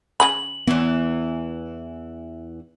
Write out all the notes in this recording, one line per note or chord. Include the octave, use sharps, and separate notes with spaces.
C#3 G#4 B5 F#7
E2 E3 B3